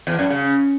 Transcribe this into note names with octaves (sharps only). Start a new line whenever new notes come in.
E2
F#2
C#3